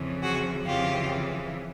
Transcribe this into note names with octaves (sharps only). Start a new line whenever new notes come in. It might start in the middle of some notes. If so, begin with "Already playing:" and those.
Already playing: F2 C#3 E3
F#4 G#4
F2 C#3 E3 F4 G4